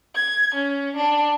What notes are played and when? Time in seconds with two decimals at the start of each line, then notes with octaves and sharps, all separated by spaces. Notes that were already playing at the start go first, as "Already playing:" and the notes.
0.15 G#6
0.54 C#4
0.96 D4